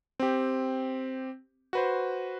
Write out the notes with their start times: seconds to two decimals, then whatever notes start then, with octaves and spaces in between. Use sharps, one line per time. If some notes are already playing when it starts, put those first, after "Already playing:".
0.20 C4 G4
1.73 F#4 B4 C5